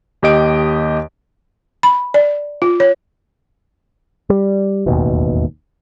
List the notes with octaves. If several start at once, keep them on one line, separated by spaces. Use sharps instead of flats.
D#2 G4 D#5 D7
B5
D5
F4
C#5
G3
E1 A1 D#2 B2